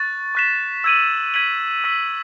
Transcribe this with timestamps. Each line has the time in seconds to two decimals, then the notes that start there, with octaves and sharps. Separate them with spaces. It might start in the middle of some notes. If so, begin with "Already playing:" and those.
Already playing: C#6 F#6 A6
0.35 C#6 F#6 B6 E7
0.84 E6 G#6 D#7 F#7
1.34 G#6 B6 D#7 F#7
1.84 C#6 E6 B6